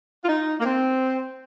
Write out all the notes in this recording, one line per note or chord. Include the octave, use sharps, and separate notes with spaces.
F4
D#4
A#3
C4